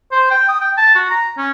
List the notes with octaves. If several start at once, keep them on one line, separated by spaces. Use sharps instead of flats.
C5
G5
D#6
G5
A5
F#4
A#5
C#4